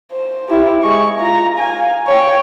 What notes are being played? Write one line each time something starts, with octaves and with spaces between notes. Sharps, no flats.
C5
E4 G4
G#3 C#6
F4 A#5
F5 G#5
C#5 G5